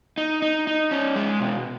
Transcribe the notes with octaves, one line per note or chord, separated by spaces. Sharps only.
D#4
D#4
D#4
C#4
G#3
B2